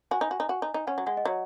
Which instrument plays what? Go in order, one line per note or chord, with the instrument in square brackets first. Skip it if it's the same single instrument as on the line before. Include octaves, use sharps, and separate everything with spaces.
[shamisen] F#4 [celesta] G#5
[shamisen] D#4
F#4
D#4
F#4
D#4
D#4
[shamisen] C#4 [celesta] F#5
[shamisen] F#3
[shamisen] G#3 [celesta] F#5
[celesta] D#5
[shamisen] F#3 [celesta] C#5